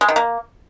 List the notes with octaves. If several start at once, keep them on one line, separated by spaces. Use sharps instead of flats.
G#3
D#3
A#3